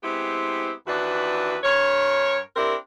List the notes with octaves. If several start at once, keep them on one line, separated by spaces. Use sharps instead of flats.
G#3 B3 C4 E4 G4
D#2 E3 D4 F#4 B4
G2 A#4 C#5
C4 D4 E4 G4 A#4